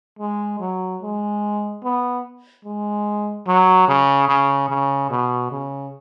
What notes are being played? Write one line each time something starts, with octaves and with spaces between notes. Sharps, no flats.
G#3
F#3
G#3
B3
G#3
F#3
C#3
C#3
C#3
B2
C#3